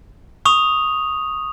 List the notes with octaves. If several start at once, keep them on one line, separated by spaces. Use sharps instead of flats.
C#6 D#6 F7